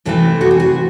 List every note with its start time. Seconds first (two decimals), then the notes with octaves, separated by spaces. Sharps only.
0.05 C3 E3 A3 C4 A4
0.41 F#4
0.51 G#4
0.60 F#4